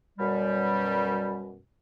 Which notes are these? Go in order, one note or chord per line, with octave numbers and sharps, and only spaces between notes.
F#2 B2 G3